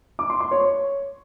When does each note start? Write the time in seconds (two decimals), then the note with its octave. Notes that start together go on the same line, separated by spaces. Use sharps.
0.19 D6
0.30 C6
0.41 C6
0.51 C#5